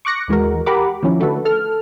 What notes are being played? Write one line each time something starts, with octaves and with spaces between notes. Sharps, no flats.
C#6 D6 F#6 A#6 C#7
D#2 E3 G#3 F#4 A#4
G4 A#4 F#5 A#5 B5 D6
D#3 F3 C#4 E4
D3 A3 F#4 A4 B4
A4 F6